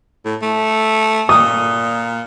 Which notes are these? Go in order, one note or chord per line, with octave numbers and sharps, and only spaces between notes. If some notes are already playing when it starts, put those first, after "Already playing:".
A2
A3
A#2 D#6